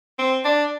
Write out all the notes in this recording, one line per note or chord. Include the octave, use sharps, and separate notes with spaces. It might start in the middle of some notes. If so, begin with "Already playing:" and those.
C4
D4